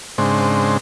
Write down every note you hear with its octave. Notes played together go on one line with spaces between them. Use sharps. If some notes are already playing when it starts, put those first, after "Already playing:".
G#2 C#3 G#3 C4 D4 C5